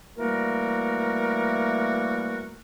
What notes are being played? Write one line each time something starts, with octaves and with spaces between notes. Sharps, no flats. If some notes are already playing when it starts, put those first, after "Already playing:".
E3 G3 A3 A#3 F#4 A#4